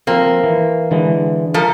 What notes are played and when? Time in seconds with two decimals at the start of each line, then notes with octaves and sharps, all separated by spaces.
0.07 F3 A#3 C4
0.44 E3
0.91 D3 E3 G#3
1.54 F3 A4 A#4